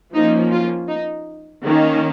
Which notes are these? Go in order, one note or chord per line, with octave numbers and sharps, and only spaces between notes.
F3 A#3 C#4 D#4
F4
D#4
D#3 A#3 C#4